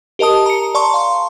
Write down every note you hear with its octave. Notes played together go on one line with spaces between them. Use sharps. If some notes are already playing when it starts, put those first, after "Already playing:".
G4 A#4 D#5 A5 D#6
A#5 C#7
D5 A5 A#5 C6 C#6
F5 C6